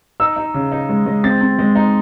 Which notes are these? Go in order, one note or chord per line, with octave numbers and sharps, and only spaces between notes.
D#4 E6
D#4
C#3
D#4
G#3
G#3
C4 A6
C4
G#3
D#4